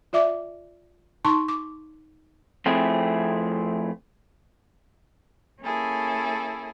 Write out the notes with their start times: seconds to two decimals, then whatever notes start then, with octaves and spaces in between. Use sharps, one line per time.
0.13 F4 D5 E5 D6
1.25 D#4 A5 C6 C#6
1.48 D6
2.66 F2 A3 C4 E4 G#4
5.62 A#3 C#4 E4 G#4 A4